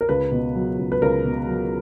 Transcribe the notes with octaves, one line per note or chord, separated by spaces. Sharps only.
A#4
C#2 B4
B2
F#3
C#2
B4
C#2 A#4
B2
F#3